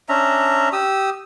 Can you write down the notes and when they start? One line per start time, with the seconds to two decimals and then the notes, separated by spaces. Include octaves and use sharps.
0.09 C#4 D4 E5 A#5
0.73 G4 D#6 E6